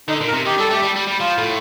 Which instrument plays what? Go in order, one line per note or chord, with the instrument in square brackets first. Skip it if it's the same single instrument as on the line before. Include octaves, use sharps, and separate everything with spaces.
[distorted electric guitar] D3 [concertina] D#4
[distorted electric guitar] A#2
[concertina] A#4
[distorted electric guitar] C3
[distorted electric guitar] D#3 [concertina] G4
[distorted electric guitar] G3 [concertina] A4
[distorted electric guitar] A3 [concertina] G4
[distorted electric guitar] G3
G3
G3
[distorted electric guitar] F3 [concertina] F4
[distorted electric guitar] A2